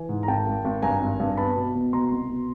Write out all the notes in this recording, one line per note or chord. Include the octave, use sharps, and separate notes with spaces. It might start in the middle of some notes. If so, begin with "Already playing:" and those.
Already playing: E3 G#5
G#2
A#5
G#1 G5 A5
G#1
G#1
G2 G#5 A#5
G#1
G2
B3 A5 B5
B2
B2
B2 A#5 C6
C2
B2